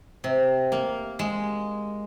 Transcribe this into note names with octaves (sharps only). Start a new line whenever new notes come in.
C3
A#3
G#3